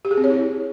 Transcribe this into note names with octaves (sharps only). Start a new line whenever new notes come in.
G4
G#4
C4
C#5
E4